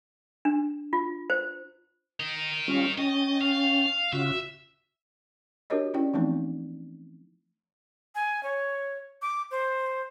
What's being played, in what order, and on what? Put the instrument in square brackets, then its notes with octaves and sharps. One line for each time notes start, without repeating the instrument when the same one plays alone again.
[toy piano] D4
F4
C5
[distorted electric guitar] A#4 D#5
[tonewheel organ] G3 C#4 F4
[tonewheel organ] C#4 G5 A6 [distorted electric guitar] D#5
[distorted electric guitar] F5
[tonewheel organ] C#3 F4 F#4 [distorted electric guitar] E5
[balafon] D4 F#4 G4 A#4 C#5 D#5
C#4 E4 D5 G5
E3 F3 A3 B3 C4 D#4
[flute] G#5
C#5
D6
C5